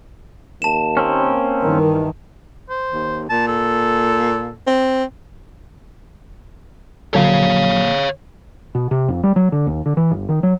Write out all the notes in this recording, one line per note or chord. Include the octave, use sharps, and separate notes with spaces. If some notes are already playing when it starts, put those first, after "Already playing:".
D#2 A5 E7
A#3 C4 C#4
G2 D#3 E3 A#4
C5
D#2
A#2 A5
A4
C4
A#1 D3 F#3 C#5 F5
B2
C3
F2
G3
F#3
D3
D#2
D3
E3
G1
D#3
F#3